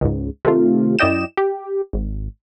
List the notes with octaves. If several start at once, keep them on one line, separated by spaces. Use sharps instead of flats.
C#2 G#2
C3 D#3 A3 F4
F#2 E4 D5 D#5 G5 E7
G4
G#1